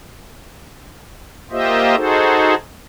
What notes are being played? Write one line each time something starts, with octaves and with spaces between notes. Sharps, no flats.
A#3 F4 G4 C5 D#5 E5
D#4 F#4 G#4 A4 C5